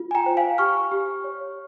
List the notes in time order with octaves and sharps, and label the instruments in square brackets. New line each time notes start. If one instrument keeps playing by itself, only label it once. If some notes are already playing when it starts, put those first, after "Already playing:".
Already playing: [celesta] F4
G#5
G5 A#5
C5
F5 G#5
G4 C#6 F6
G4
C#5